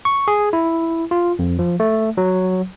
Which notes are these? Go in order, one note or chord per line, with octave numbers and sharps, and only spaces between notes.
C#6
G#4
E4
F4
F2
F3
A3
F#3